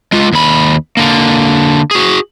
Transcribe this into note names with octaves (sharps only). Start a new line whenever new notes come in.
G#3 F4
D#2 B5
D3 A#3
F#4 G#4